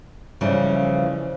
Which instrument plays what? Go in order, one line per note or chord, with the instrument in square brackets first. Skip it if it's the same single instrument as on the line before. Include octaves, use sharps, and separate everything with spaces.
[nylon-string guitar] C#3 E3 F3 G3